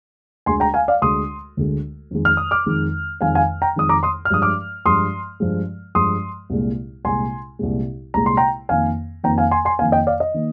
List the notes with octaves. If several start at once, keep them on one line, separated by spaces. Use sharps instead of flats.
D2 D3 G#3 G#5 C6
G5 A#5
F5 G#5
D5 F5
D2 D3 G#3 C6 D#6
D2 D3 G#3
F2 D#3 G#3
F6
D#6
D6 F6
F2 D#3 G#3
F2 D#3 G#3 F5 G#5
F5 G#5
G5 A#5
F2 D#3 G#3 D#6
A#5 D6
C6 D#6
F6
G2 F3 G#3 D#6
D6 F6
G2 F3 G#3 C6 D#6
G2 F3 G#3
G2 F3 G#3 C6 D#6
C2 A#2 G#3
C2 A#2 G#3 G#5 C6
C2 A#2 G#3
C2 A#2 G#3 A#5
C6
G5 A#5
F2 D#3 A#3 F5 G#5
F2 D#3 A#3 G5 A#5
F5 G#5
G#5 C6
G#5 C6
F2 D#3 A#3 F5 G#5
D#5 G5
D5 F5
D#5
D#3 A#3